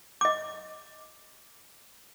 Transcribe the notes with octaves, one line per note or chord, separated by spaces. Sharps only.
D#5 D6